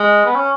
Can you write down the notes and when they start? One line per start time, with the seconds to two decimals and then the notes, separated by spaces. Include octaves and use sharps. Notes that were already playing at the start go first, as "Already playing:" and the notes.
Already playing: G#3
0.25 B3
0.35 C#4